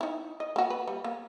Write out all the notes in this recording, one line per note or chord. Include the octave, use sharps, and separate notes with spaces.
D#4 E4
D#5
A#3 F#4
B4
G3
A#3